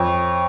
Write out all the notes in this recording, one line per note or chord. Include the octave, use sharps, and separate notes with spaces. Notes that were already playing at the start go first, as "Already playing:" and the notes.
Already playing: F2 C#5